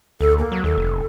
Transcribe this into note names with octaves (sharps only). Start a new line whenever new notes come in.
D2 A4
A#3
F#3
D#2 A4
F1